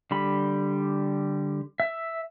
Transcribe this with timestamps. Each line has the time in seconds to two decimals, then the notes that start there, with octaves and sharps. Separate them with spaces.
0.11 D3 G3 B5
1.80 E5